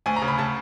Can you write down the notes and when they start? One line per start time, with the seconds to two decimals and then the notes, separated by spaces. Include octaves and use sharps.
0.06 D2 G#5
0.16 A#5
0.22 C#3
0.28 B5
0.38 C#3 A5